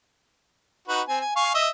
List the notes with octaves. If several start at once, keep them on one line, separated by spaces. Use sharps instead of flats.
D#4 F#4 B4
C4 G#5
G#5
F5 G#5 C#6
D#5 E5